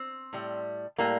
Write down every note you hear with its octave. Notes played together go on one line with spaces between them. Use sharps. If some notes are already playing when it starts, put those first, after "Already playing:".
Already playing: C4
A2 G3
A2 G3 A#3